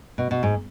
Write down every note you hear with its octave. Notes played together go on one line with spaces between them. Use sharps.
B2
B2
G#2